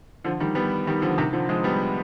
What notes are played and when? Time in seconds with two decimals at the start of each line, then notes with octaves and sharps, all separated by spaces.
0.24 D3 F3
0.40 D#3 G3
0.55 G3 B3
0.87 D#3 G3
1.02 D3 F3
1.18 C3 D#3
1.33 D3 F3
1.49 F3 G#3
1.64 G3 B3